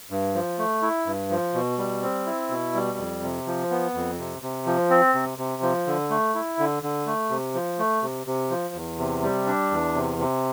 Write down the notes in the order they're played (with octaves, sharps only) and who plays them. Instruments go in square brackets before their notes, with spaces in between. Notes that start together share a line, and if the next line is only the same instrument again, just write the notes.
[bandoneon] G2
F3
A3
E4
G2
F3
B2
G3
C4
E4
B2
G3
F2
C3
F3
B3
F2
C3
C3
F3
C4
C3
C3
F3
D3
A3
E4
D3
D3
A3
C3
F3
A3
C3
C3
F3
E2
C3
G3
D4
E2
C3
C3